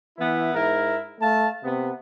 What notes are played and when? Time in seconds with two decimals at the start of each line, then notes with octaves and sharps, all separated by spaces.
0.18 E3 B3 E4
0.53 G#2 E4 A#4
1.19 A3 F5 A5
1.63 C3 B3